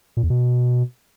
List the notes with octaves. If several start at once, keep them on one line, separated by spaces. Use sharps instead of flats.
A#2
E2
B2